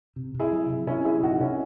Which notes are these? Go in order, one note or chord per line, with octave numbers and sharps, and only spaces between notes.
C3
C3
E4 G#4
F#3
C3
C3 C#4 E4
F#3 E4 G#4
C3 D#4 F#4
C3 C#4 E4